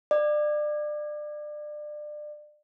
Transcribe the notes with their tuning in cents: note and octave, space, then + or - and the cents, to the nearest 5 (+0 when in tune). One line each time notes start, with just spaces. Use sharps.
D5 +30